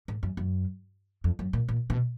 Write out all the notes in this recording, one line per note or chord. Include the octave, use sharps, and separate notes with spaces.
G#2
F#2
F#2
F2
F#2
A#2
A#2
B2